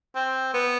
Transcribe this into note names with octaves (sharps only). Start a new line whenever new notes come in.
C4
B3